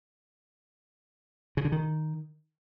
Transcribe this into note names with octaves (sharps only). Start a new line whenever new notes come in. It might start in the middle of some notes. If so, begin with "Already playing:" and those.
C#3
D3
D#3